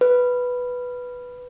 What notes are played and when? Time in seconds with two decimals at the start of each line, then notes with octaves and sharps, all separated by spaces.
0.01 B4